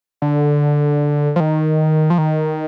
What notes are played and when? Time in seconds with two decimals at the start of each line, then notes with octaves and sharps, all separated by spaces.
0.22 D3
1.36 F3
1.40 D#3
2.10 F3
2.18 D#3